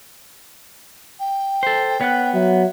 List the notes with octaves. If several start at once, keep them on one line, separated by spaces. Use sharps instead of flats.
G5
A4 C5
B3 C#5 F#5 F#6
F#3 E5